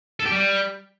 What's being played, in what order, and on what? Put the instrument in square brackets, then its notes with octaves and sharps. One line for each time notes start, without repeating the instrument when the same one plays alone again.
[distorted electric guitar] A4
G4
G3